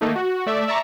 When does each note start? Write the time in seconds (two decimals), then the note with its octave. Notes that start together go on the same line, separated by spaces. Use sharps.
0.01 D#3 A3 A#3 D#4
0.16 F#4
0.46 A3 D5 E5
0.67 D5 E5 A5 A#5 C#6